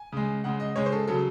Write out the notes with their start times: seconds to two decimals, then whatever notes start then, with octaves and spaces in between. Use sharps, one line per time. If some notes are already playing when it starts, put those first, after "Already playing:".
Already playing: G#5
0.12 C#3 G#3
0.44 C#3 G#3 F#5
0.60 D#5
0.76 C#3 G#3 C#5
0.86 C5
0.92 A4
1.07 C#3 F#3 A4